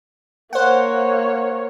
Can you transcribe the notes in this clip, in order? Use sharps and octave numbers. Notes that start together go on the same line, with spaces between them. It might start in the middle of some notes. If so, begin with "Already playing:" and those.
A#3 C5 C#5 F#5